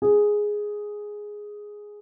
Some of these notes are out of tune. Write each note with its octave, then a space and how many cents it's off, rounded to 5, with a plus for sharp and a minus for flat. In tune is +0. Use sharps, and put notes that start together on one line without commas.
G#4 +0